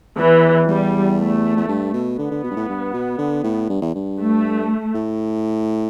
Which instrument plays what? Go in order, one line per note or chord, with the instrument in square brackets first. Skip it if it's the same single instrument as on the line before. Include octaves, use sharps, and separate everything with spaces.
[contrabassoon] E2 [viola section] E3
[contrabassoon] E2 [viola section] G3
[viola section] A3
[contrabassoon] E2
G2
B2
[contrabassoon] D3 [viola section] B3
[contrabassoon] D3
B2
G2
A2
G2
B2
D3
A2
G2
E2
G2
[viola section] A3
[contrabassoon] A2